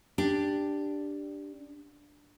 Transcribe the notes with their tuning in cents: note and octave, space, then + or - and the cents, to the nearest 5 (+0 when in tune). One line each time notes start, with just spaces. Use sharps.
D4 +0 G4 +5